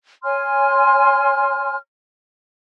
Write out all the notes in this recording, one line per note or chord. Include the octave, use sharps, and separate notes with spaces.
C#5 G#5 C6 F6